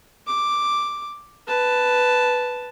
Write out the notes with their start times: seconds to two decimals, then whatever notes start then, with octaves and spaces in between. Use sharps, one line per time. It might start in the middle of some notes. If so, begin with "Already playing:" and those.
0.27 D6
1.48 B4 A5